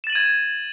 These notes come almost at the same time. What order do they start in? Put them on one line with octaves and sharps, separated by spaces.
E7 A6 F#7 D#7 G#6